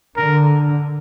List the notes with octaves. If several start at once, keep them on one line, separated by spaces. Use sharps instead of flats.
D3 A#4